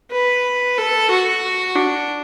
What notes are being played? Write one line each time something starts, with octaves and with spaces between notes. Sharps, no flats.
B4
A4
F#4
D4